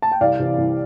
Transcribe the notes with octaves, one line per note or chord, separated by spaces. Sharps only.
A5
G5
C2 D5 F5
C3 E3
C2